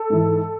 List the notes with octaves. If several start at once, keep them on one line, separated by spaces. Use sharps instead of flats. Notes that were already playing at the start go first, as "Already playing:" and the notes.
Already playing: A4
G#2 E3